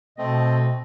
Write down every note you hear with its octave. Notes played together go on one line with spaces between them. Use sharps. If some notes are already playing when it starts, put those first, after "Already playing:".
B2 A3 C4 D#5